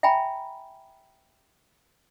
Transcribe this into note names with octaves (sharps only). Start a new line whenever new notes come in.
E5 G5 G#5 A#5 B5